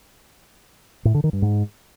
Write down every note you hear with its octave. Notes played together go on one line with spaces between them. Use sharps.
A2
D3
D#3
G2
G#2